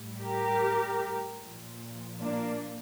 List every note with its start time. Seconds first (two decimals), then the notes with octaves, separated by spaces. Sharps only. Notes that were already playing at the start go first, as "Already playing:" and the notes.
Already playing: A2 G3
0.19 G4 A#4
1.40 A#2 F3
2.21 A#3 D4